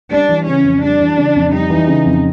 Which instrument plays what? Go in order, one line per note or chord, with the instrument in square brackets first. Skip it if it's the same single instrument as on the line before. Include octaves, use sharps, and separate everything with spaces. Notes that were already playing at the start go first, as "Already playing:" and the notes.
[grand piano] G3 [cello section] D4
[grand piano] E3
[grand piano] C#3 [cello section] C#4
[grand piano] F2
[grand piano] G3 [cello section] D4
[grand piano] E3
C#3
F2
[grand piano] G3 [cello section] D#4
[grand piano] E3
C#3
F2